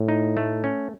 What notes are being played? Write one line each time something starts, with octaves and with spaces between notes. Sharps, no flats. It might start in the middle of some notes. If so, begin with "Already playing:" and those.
Already playing: A2
D#4
A3
C#4